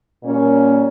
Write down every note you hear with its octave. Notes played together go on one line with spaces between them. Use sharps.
A#2 G3 A#3 C#4